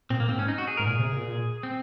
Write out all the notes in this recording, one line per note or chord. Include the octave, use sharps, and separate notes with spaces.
A#2 C4
A#3
G#2 C4
C#4
D#4
F#4
G#4
G#2 A#4
A#2 G#4
C3
A#2
C4